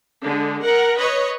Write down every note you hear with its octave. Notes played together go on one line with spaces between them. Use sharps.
D3 G#3
A#4 F#5
B4 C#5 D#5